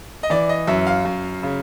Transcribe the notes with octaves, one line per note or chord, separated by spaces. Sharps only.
D#5
E3 D5
D#5
F#2 E5
F5
F#2
C#3